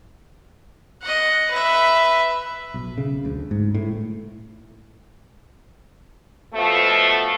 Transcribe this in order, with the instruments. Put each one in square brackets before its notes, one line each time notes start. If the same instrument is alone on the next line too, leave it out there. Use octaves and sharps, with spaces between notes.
[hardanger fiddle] D#5 F#5
B4 E5
[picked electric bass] B1
C#3
D2
G#2
A2
[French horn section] B2 F3 A3